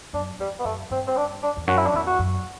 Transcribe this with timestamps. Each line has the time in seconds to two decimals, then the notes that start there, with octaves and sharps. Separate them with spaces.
0.13 F#2 D4
0.39 E2 G3
0.59 B3
0.65 F#2 A3
0.90 G2 C4
1.07 C4
1.17 D4
1.43 D4
1.57 E2
1.67 F#2 F#4
1.77 E4
1.86 D4
1.94 E2 E4
2.07 F#4
2.19 F#2